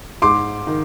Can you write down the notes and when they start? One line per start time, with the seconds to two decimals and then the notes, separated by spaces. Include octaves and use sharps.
0.22 G#2 C6 D6
0.67 D#3